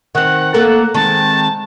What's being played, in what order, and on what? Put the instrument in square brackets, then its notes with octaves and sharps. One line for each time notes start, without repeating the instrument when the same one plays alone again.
[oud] D#3 C4 [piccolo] F#5
[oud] A#3 A4 A#4
[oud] D#3 G#3 C4 [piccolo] A5